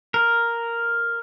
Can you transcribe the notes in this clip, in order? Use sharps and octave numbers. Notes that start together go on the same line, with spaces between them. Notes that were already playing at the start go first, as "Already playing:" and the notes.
A#4